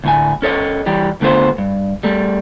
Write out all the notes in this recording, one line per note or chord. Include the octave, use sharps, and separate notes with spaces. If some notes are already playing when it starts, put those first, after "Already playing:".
D2 A2 G#5
C#4 A4 C#5 D#5
E3 G3 G4
D3 A3 B3 F4 C5
G2
G3 A3